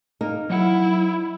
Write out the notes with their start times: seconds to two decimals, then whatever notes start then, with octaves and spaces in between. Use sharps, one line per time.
0.21 A#3 D#4 A#4
0.50 F#3 E4 C#5 F#5